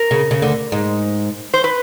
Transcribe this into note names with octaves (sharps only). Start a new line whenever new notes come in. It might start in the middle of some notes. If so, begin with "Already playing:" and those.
Already playing: A#4
C#3
C#3
D2 D3
G#2
C5
B4